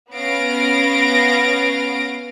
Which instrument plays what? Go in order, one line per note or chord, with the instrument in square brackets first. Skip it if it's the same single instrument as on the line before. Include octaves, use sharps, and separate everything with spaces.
[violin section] B3 C#4 F5 A#6 D7